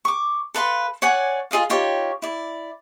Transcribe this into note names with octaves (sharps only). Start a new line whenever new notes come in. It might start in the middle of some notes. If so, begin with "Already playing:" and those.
C#6 D6
A4 B4 F5 C6
C#5 D5 F#5 G#5
F4 G#4 D#5 F5
D#4 F4 G4 C#5
E4 D5